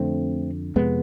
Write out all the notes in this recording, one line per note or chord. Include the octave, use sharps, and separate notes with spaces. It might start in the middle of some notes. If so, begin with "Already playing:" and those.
Already playing: F2 D3 A3 C4
F2 C3 G#3 B3